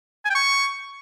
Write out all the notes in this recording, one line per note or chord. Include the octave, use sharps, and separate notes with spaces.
G#5
G5
C#6